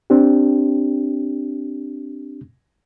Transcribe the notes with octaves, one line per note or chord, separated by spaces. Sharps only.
C4 D4 G4